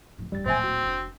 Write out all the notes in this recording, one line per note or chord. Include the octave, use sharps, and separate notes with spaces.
F2 A2
D1 G2 G3 A6
D1 A#2 C4 C5 E5 G#5
F#4
F1 D4